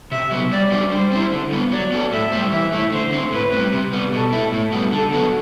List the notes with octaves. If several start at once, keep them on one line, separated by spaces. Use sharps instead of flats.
C3 E5
F#3 B3
G3 D5
D4 F#4 C5
G3 C5
C4 E4
D3
G3 B3
F#3 D5
B3 F#4 A4
A2 E5
G3 C4 G4 C5
E3 E5
A3 E4
D3 C5
A3 C4
A2 B4
G3 C4
C3
G3 B3
B2 A4
A3 E4
A2
G3 B3 F#4
D3 A4
F#3 B3 F#4